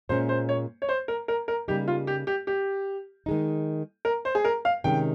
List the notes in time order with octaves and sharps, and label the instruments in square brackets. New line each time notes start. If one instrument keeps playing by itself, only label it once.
[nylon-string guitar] A#2 G#3 C#4 [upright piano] C5
[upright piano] C5
C#5
C#5
C5
A#4
A#4
A#4
[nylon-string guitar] C#3 G3 A#3 D#4 [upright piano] G4
[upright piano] F4
G4
G4
G4
[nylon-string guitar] D#3 G#3 D#4
[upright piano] A#4
C5
G#4
A#4
F5
[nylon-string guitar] C3 D#3 G#3 C#4 [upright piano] G5